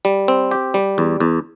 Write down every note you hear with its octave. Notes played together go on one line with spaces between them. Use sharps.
G3
C4
G4
G3
E2
E2